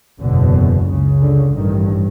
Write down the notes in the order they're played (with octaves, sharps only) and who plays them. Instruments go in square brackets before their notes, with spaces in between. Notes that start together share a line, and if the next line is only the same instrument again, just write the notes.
[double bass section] F#1 E2 B2 D3
C#2 C#3
D3
A1 G2 D#3